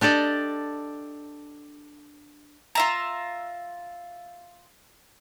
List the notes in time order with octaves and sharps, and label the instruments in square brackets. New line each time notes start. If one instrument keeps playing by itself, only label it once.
[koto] D4 G4 A4 D5 D#5
[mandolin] F4 E5 A#5